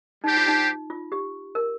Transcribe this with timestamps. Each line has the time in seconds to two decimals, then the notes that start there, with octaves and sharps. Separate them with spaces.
0.24 G3 D4 D#4 G4 C5
0.37 F4
0.48 D#4
0.90 F4
1.12 G4
1.55 A#4